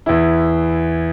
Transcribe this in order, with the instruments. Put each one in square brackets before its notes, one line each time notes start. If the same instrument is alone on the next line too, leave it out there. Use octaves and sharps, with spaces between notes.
[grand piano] E2 E3 E4